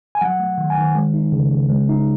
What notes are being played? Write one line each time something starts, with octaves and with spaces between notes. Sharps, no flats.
G#5
F#3 F#5
A3
D#3
G#5
D#3
G#3
D#4
C#3
C#3
G#3
D#4